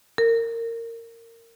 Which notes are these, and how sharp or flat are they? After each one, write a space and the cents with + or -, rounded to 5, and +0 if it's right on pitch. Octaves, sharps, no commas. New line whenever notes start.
A#4 -20